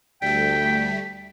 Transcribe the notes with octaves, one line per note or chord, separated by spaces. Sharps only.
D2 G3 A3 G5 B6